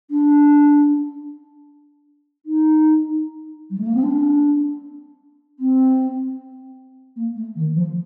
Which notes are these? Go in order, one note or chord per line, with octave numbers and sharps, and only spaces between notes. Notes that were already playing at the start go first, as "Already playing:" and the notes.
D4
D#4
G3
A3
A#3
C4
D4
C4
A#3
A3
D#3
F3